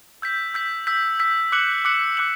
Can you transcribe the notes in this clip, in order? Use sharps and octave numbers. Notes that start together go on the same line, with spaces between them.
E6 G6 B6
E6 G6 B6
E6 G6 B6
E6 G6 B6
D6 F#6 C#7 F#7
D6 F#6 C#7 F#7
D6 F#6 C#7 F#7